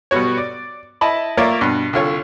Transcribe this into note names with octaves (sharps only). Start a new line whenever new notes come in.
B2 G3 B3 F#4 C#5
D5
E4 D#5 A5 B5
A#3 F4 A#4 C#5 D5 E5
G2 B2
C2 D3 F4 C#5